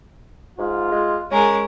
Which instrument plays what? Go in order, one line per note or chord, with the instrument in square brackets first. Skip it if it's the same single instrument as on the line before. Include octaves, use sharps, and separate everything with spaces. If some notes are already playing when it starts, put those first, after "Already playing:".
[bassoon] G#2 [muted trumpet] F4
[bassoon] G#3
[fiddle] G#3 A#4 [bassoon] C#4